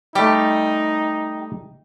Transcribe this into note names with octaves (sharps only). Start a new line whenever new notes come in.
G3 A3 D#4 G4